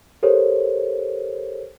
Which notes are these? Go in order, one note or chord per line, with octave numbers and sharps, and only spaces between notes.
G4 A4 A#4 C5 C#5